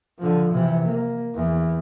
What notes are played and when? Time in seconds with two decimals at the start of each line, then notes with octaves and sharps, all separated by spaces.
0.18 D3 F3
0.52 C3 E3
0.84 A#3
1.35 E2